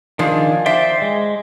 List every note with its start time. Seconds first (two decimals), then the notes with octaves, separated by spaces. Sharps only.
0.19 D#3 F3 D4 G#4
0.66 C5 D5 E5 G5
1.02 G#3